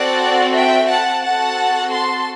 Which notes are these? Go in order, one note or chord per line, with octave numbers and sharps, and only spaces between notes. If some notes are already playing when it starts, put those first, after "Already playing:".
Already playing: C4 F#4 A4 D5 F#5
E5 G5
F#5 A5
C4 F#4 A4 F#5 A5
A5 C6